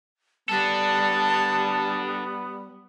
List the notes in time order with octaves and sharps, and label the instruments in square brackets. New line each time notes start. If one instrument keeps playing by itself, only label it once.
[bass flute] G3 [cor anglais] B3 [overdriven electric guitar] D4 A4 [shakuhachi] A5